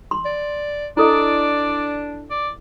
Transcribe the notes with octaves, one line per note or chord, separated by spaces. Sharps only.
C6
D5
D4 E4 A4 D5 D#5
D5